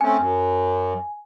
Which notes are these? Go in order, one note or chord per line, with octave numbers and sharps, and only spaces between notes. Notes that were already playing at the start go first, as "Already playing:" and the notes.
A3 C4 C#4 G#5
F#2